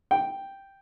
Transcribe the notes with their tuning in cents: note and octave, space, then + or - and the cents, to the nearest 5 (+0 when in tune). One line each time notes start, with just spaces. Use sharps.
G5 +0